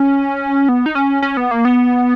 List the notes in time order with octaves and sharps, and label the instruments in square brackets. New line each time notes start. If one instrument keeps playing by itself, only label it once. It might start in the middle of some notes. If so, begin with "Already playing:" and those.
Already playing: [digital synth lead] C#4
B3
D#4
C#4
C#4
B3
A#3
B3